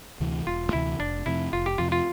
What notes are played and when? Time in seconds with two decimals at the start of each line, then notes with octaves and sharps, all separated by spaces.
0.20 D2 C3 E3
0.47 E1 F4
0.73 D2 C3 E3 E4
1.00 F1 D4
1.26 F2 C3 E4
1.53 F1 F4
1.66 G4
1.78 F2 C3 F4
1.92 F4